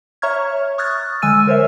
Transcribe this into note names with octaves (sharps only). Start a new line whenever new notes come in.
C#5 E5 A#5 C#6 F6 G#6
C#6 D#6 F6 F#6 G#6 A6
D3 G#3 G#5 E6 F6 D#7
A#4 C5 C#5 E5